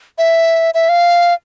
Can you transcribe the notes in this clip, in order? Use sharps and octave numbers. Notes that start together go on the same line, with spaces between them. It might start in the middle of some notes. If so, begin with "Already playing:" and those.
E5
E5
F5